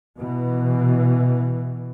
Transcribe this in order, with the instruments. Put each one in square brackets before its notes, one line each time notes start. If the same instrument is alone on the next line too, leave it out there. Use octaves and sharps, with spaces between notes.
[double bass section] B2 E3